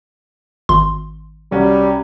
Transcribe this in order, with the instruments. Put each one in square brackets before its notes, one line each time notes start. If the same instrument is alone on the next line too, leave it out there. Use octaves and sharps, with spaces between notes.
[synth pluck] G#1 C6
[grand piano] C2 C#4 F#4 [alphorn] G3